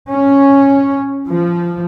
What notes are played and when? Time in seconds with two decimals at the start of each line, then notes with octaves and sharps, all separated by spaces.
0.11 C#4
1.27 F3